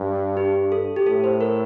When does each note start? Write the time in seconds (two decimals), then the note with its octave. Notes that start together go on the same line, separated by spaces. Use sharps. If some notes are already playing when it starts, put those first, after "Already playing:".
Already playing: G2
0.37 G4
0.72 A4
0.96 G4
1.06 A2 A4
1.24 C5
1.41 A#4